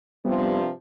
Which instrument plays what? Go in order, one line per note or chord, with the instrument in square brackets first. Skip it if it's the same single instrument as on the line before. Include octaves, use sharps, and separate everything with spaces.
[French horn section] G2 C3 F3 [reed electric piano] G3 B3